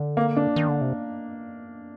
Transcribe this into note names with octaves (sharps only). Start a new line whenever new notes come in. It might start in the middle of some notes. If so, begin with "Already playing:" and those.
Already playing: D3
A#3
D4
D#3
D3
C3